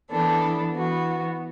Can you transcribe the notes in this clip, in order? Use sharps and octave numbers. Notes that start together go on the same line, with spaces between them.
E3 B3 D4 A4
E3 B3 F#4